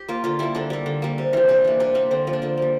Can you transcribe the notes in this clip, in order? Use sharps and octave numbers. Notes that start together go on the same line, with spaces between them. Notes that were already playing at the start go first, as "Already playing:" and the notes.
Already playing: G4
A#3 F4
D3 F4
G3 A#3 E4
D3 D4
G3 A#3
D3
G3 A#3
C3
E3 G3 C4
C3 D4
E3 A#3
C3 D4
G3 A#3 C4
D3 C4
F3 A#3
D4
D3 C4
G3 A#3